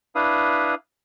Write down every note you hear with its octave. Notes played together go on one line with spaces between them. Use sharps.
D4 E4 B4 F5 D#6